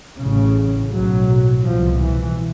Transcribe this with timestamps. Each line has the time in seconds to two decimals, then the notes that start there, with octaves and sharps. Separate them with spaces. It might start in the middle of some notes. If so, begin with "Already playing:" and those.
0.20 A1 A2 C#3
0.93 B1 A2 F#3
1.66 C2 B2 F3
2.02 E3